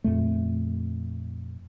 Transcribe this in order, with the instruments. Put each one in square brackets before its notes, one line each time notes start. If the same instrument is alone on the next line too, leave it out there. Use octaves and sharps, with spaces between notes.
[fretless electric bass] F2 A#2 A3